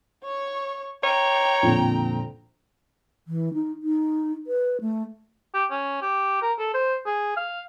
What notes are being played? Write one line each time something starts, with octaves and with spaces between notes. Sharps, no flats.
C#5 C#6
C#5 G5 A#5
F2 A#2 D3
E3
D#4
D#4
B4
A3
G4
C#4
G4
A#4
A4
C5
G#4
F5